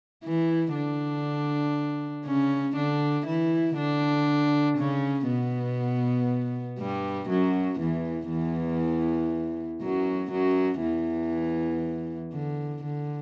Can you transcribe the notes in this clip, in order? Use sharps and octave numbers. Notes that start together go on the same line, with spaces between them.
E3 E4
D3 D4
C#3 C#4
D3 D4
E3 E4
D3 D4
C#3 C#4
B2 B3
G2 G3
F#2 F#3
E2 E3
E2 E3
F#2 F#3
F#2 F#3
E2 E3
D3
D3